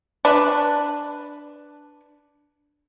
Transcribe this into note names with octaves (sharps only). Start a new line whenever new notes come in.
D4 B4